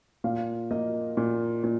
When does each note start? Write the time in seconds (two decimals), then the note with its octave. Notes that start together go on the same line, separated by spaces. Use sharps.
0.24 A#2 F5
0.71 A#3 D#5
1.17 A#2
1.64 A#2